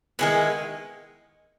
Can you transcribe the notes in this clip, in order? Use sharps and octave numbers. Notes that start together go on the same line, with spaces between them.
D#3 G#3 B3 E4